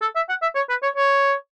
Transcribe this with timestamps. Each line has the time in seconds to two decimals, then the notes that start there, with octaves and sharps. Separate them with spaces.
0.02 A4
0.16 E5
0.29 F#5
0.42 E5
0.55 C#5
0.70 B4
0.83 C#5
0.96 C#5